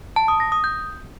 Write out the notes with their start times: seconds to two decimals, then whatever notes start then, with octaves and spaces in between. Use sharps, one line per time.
0.16 A5
0.28 D#6
0.40 A#6
0.52 D#6
0.64 G6